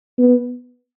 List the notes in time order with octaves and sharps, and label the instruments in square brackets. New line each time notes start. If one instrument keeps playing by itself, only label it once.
[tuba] B3